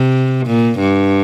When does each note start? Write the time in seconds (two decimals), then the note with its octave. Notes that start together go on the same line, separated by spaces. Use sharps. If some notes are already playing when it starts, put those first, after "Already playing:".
Already playing: C3
0.47 A#2
0.79 G2